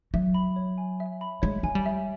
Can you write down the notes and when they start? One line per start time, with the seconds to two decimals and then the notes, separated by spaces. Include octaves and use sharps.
0.14 F#3 E5
0.34 B5
0.56 C#5
0.78 G#5
1.00 E5
1.21 B5
1.42 G#3 C#5
1.63 G#3 G#5
1.75 G3
1.86 E5